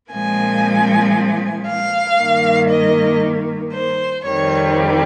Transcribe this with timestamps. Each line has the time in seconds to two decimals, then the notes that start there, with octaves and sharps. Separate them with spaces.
0.11 A#2 F3 G#3 C4 G#5
1.66 F5
2.17 G2 D#3 A#3
2.69 D#5
3.72 C5
4.24 F2 D#3 G3 C4 C#5